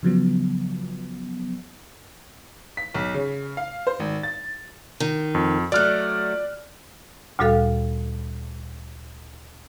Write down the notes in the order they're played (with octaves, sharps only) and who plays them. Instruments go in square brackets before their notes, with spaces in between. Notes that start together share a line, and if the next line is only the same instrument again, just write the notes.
[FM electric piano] C#3 F3 F#3 B3
[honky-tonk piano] B6
B1
C#3
F5
C5
G#1
A6
[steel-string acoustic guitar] D#3
[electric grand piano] F2
[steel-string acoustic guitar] F#3 A3 [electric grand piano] D5 F6 F#6
[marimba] D2 A#2 G3 F#4 A4 F5